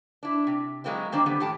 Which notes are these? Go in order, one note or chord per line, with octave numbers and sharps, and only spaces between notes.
D4 E4
C3
F#3 G#3 A#3 C4 E4
D#3 A#3 C4 D4
D3 D#3 G3 B3
E2 A2 G4 A5